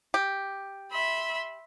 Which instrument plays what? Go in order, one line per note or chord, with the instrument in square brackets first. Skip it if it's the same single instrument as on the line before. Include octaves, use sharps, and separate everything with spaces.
[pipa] G4
[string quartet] E5 B5 C6